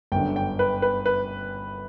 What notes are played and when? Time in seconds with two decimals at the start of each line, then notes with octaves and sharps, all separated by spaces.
0.12 G1 F#2 D3 G5
0.36 G5
0.59 B4
0.82 B4
1.06 B4